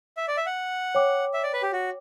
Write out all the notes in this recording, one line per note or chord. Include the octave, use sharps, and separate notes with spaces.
E5
D5
E5
F#5
C#5 G5 D6
E5
D5
B4
G4
F#4